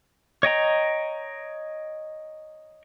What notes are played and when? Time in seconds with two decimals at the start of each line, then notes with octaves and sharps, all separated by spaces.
0.43 C#5 D#5 G5 A#5